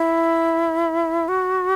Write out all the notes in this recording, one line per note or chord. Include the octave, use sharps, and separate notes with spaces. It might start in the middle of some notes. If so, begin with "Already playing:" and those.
Already playing: E4
F#4